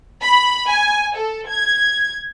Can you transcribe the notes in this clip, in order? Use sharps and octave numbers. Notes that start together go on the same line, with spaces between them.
B5
G#5
A4
G#6